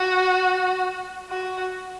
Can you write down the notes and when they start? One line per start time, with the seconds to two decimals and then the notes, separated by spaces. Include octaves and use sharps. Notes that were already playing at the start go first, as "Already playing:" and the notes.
Already playing: F#4
1.30 F#4